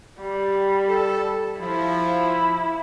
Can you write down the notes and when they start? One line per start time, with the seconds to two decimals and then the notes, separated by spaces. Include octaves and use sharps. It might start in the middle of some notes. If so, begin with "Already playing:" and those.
0.20 G3
0.89 A4
1.60 F3 E4